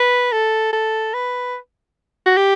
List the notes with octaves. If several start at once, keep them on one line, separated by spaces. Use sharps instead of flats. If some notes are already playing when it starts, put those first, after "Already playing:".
Already playing: B4
A4
A4
B4
F#4
G4